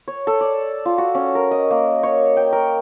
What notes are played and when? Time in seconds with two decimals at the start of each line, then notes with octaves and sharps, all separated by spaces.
0.08 C#5
0.27 A4
0.41 D5
0.85 F4
0.98 F#4
1.15 C#4
1.35 A#4
1.51 D#5
1.71 A#3
2.03 C#5
2.37 G5
2.53 A#4